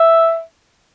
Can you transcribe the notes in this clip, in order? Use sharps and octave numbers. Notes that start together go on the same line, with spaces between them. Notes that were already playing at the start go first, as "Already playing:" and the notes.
Already playing: E5